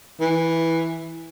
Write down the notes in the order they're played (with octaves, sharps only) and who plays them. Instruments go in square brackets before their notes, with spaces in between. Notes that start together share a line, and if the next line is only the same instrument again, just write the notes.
[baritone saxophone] E3